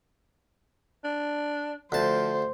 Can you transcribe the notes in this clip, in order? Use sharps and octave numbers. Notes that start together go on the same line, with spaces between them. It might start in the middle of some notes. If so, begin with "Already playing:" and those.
D4
D2 F3 C5 A5